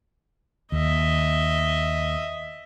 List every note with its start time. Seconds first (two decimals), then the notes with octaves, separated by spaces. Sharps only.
0.72 D#2 D#5 E5